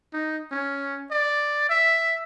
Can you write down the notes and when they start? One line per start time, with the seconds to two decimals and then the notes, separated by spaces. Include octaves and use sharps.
0.13 D#4
0.51 C#4
1.11 D5
1.70 E5